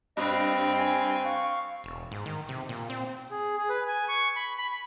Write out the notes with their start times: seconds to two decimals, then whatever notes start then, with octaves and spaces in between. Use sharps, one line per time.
0.17 G2 C4 D#5
0.79 G#5
1.25 F5 C#6
1.84 E1
2.12 G#2
2.26 D#3
2.49 C3
2.69 A#2
2.90 C4
3.31 G#4
3.57 G#4
3.69 B4
3.87 G#5
4.08 C#6
4.36 B5
4.58 B5
4.72 B5